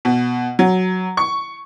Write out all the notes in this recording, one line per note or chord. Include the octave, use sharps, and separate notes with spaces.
B2
F#3
C#6